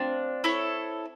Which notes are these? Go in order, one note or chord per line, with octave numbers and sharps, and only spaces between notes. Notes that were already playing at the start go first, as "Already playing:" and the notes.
Already playing: C4 D4 F4
E4 A4 C#5